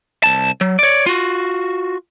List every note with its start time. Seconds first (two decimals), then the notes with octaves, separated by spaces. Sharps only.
0.24 C2 A5
0.61 F#3
0.79 C#5 D5
1.06 F4 F#4